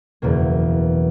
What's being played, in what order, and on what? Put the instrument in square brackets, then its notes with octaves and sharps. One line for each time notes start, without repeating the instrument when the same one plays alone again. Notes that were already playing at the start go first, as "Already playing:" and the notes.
[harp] F#1 E2 B2 A#3